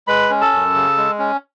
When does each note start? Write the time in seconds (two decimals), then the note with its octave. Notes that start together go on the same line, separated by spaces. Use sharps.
0.07 G#3 B4 B5
0.30 C#4
0.41 A4 A5
0.52 F#2
0.75 C#3
0.97 G#3
1.19 C#4